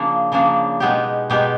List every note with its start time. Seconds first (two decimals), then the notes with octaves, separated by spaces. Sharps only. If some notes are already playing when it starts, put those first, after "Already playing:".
Already playing: C#3 F3 A#3 D4
0.32 C#3 F3 A#3 D4
0.80 B2 G#3 B3 D#4 G4
1.30 B2 G#3 B3 D#4 G4